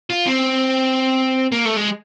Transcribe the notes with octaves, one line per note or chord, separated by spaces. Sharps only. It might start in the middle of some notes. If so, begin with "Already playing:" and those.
F4
C4
A#3
A3
G#3